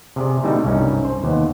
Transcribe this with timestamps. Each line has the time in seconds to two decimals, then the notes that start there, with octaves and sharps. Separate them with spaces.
0.16 C3 G#4 D5
0.43 B2 D3 G3 A3 D#4 E4
0.65 C2 G2 C#4 D#4 D5
1.05 C5
1.24 D#2 B3